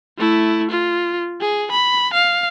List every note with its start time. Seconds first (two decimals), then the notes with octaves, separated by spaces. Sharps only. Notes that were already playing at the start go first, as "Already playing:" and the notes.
0.18 A3 E4
0.71 F4
1.40 G#4
1.72 B5
2.14 F5